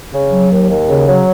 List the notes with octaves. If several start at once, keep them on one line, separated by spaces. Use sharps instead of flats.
C#3
F#3
D#2
D#2
C#3
F#3